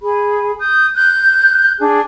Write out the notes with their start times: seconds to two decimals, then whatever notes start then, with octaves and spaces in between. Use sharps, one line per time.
0.01 G#4 B5
0.58 D#6 G6
0.95 F#6 G6
1.80 D4 G#4